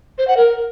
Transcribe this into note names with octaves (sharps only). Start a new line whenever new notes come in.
C5
F#5
A#4